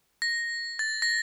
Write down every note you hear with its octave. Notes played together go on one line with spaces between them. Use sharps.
A#6
A6
A#6